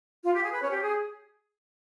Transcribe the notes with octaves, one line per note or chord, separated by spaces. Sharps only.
F4
G4
G#4
B4
C#4 C#5
G4
G#4